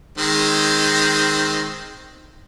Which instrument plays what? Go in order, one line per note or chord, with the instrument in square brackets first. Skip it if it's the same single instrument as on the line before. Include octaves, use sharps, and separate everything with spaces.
[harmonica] D#3 G#3 C4